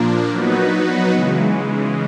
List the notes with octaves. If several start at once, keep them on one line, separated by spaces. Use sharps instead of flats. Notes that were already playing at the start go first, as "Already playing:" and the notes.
Already playing: A#2 F3 A#3 D4
F#3 B3 D#4 F#4 B4
C#3 E3 G#3